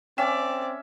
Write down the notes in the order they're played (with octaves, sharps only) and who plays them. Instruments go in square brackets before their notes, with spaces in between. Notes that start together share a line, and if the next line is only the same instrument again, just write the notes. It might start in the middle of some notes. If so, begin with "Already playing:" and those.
[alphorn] C4 [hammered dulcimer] C#4 E5 [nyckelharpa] D5 [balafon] G5 G#5